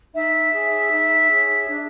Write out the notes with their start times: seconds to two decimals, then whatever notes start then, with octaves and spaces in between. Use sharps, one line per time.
0.13 D#4 E5
0.52 G#4 C#5
0.90 D#4
1.30 G#4 C#5
1.67 D4